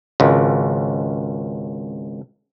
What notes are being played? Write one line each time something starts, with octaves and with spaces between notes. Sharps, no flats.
G#1 C#2